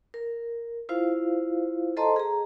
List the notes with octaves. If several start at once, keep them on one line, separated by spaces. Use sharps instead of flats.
A#4
E4 F4 C5 F5
A4 C5 D#5 A5 A#5 C6
G#4 A#5